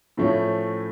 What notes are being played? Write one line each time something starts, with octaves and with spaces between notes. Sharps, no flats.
A2 F3 A3 C#4